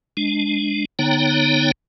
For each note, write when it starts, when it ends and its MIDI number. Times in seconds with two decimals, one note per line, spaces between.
0.17 0.85 56
0.17 0.85 62
0.99 1.71 50
0.99 1.71 59
0.99 1.71 63
0.99 1.71 73
0.99 1.71 79
0.99 1.71 82